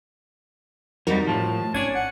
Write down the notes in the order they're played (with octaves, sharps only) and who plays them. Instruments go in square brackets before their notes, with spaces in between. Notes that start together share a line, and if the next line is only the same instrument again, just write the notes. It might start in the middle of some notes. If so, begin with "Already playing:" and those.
[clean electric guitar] F2 G3 [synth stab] D#4 F#4 A#4
[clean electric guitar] A2 F3 [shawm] A5
[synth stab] G#1 G#6 [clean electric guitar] C#4 [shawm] D4
[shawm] F#5